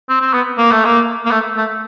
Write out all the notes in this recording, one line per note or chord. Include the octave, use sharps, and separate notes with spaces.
C4
C4
B3
A#3
A3
A#3
A#3
A3
A3